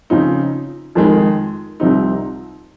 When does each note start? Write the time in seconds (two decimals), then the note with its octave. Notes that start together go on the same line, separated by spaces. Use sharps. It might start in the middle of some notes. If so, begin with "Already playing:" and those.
0.10 C#3 F3 C4 D#4
0.95 F2 D#3 G#3
1.80 C2 C3 F3 C4 D#4